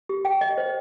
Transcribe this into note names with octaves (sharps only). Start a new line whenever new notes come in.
G4
G5
D#5
C5